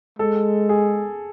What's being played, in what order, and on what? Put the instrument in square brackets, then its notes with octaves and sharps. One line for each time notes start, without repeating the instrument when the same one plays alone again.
[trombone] G#3 [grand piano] A4
[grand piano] G#4